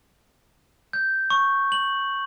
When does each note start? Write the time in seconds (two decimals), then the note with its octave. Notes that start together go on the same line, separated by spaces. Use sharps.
0.93 G6
1.30 C#6
1.72 F#7